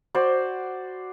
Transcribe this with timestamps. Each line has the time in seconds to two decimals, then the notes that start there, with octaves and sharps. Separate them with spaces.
0.15 F#4 C5 D5